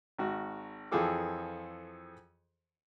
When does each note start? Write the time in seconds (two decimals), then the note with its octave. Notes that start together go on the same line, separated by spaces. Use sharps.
0.18 G#1 F#4
0.92 F2 E3 F3 G#4 A4 D6